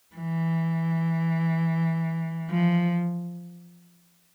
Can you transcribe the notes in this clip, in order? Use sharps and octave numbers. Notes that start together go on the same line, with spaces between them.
E3
F3